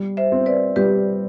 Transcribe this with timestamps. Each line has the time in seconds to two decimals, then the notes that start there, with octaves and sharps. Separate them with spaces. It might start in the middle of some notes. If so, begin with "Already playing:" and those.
Already playing: G3
0.17 C5 E5
0.32 C4
0.46 B4 D5
0.76 G3 G4 B4